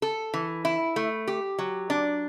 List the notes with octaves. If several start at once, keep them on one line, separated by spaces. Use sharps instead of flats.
A4
E3
E4
A3
G4
F#3
D4